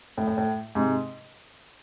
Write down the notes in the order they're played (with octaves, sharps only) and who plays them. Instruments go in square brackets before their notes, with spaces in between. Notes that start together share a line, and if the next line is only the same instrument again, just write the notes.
[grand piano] A2
A2
A2
G#2 C3